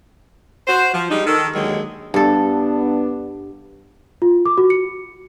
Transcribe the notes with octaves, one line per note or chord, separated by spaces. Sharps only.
F#4 C5
F3
G3 G#3 D4 D#4
D#3 A4
D#2 D3 D#3 F#3 G#3
G2 B3 D4 A4
F4
D6
F#4
C#7